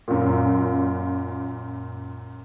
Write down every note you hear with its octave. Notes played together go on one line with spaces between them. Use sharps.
F#2 A#2